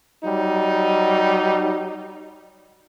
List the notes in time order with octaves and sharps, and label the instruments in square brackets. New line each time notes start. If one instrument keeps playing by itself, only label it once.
[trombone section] F#3 G3 D#4